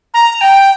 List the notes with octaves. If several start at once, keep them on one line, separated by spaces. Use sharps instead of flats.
A#5
G5